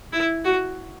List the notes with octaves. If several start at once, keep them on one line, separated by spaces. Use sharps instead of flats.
E4
F#4